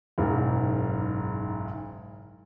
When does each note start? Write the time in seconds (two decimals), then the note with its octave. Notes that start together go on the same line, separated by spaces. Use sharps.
0.18 F#1 B1 G#2